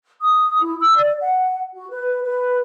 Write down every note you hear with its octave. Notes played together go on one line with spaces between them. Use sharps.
D#6
E4
E6
D5
F#5
F#4
B4
B4